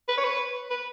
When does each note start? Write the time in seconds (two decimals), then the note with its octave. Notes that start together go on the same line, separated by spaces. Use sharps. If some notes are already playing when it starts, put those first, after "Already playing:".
0.08 B4
0.17 C#5
0.24 B4
0.70 B4